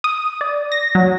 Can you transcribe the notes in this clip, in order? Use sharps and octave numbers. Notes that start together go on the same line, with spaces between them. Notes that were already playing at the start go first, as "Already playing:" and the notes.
D#6
D5
A#6
F#3